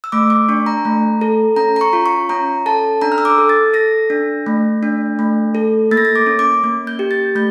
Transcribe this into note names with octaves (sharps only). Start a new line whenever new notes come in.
E6
A3 D6
D6
D4 C#6
A#5
A3
A4
C#4 A#5
A#5
C#6
F4
C#6
C#4 A#5
A4 A5
D4 A#5
F6
E6
D6
A4
A6
A4 A#6
D4
A3
D4
A3
A4
A#3 A6
A#6
A6
D6
C#4
D6
A#3
G6
G4
A6
A3 G6